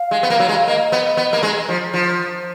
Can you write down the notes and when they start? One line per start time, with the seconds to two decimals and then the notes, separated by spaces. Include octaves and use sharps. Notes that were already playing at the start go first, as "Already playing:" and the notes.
Already playing: F5
0.11 G#3
0.23 B3
0.30 A#3
0.40 F#3
0.49 G#3
0.67 A#3 D#5
0.92 B3
1.17 B3
1.33 A#3
1.43 G#3
1.69 F3
1.93 F3